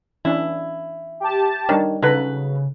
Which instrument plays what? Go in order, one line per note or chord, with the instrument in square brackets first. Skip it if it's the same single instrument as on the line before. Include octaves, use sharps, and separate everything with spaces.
[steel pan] E3 C#4 D4 [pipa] E4
[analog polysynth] G4 A5
[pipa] D#3 [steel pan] G3 D4 C#5
[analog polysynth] C#3 [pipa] F#3 B4 [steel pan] D#4 A4